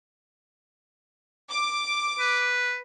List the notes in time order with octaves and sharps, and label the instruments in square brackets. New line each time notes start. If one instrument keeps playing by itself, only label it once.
[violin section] D6
[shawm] B4